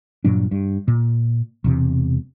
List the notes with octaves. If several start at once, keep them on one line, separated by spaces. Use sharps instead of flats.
G2 A#2 F#3 D4
G2
A#2
E1 E2 C3